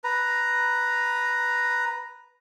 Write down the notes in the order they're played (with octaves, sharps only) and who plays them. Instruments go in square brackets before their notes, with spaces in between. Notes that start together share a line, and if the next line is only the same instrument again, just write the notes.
[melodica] B4 A#5